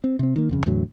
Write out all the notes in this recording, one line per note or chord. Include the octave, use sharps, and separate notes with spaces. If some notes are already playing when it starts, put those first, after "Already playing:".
C4
C3 C4
D#3 A#3
D#1 F2 C#3
E2 A2 D3 F#3